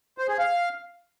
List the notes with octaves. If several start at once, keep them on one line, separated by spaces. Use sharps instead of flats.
C5
G#4
F5